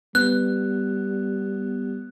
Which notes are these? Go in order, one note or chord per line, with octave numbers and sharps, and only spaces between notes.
G3 B3 F#6